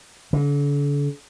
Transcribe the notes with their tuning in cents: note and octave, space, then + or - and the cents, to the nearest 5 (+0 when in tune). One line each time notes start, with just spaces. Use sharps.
D3 -40